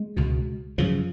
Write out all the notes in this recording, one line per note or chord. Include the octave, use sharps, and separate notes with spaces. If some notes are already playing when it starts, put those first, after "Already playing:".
Already playing: G#3
C#2 B2
F#2 C#3 F3